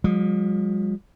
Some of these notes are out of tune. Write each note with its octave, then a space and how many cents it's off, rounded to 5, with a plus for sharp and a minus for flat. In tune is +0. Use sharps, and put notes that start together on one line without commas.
F3 +40 G#3 -45